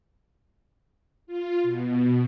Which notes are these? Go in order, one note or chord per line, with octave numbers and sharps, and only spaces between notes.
F4
B2